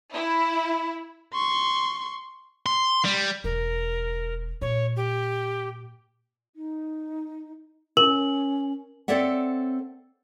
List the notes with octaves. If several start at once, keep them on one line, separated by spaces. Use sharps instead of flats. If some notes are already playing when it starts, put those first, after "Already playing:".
E4
C6 C#6
C6
G3
E1 A#4
A#2 C#5
G4
D#4
C#4 A#4 F#7
C4 A4 C#5 D5 E5 F#5